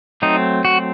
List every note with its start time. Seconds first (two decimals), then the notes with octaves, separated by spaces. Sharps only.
0.22 F#3 A3 C4 D#4
0.65 F#4